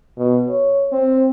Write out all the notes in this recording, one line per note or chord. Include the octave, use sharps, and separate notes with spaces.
B2
C#5
C4